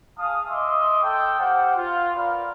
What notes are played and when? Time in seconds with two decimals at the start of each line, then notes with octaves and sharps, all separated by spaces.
0.19 G#4 F5 A5 D#6
0.49 D#5 E5 C6 D6 D#6
1.03 A4 G5
1.39 G4 C5 F5 F#5
1.77 F4
2.16 A#4 B4 D5 F5